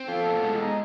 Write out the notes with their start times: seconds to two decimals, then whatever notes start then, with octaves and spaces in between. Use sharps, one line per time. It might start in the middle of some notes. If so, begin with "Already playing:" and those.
Already playing: C4
0.08 F4 A4
0.26 B2
0.43 G#3
0.61 D#4